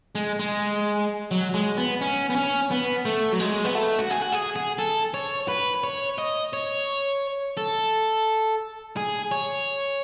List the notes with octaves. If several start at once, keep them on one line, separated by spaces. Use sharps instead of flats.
G#3
G#3
F#3
G#3
B3
C#4
B3
C#4
B3
A3
F#3
G#3
B3
A3
F#4
G#4
F#4
G#4
G#4
A4
C#5
B4
C#5
D#5
C#5
A4
G#4
C#5